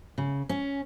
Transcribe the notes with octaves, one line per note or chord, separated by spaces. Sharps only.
C#3
C#4